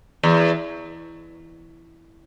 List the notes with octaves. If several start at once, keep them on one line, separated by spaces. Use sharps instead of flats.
E2